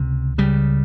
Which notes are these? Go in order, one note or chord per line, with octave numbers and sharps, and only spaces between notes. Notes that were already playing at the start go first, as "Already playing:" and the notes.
Already playing: C#2 C3
C#2 C#3 G3